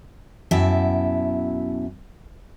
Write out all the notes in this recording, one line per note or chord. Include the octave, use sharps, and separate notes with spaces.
F#2 B2 E4 E5 G5 A5